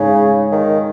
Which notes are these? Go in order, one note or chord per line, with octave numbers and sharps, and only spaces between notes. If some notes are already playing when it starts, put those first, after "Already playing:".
Already playing: G#2 C#3
D#3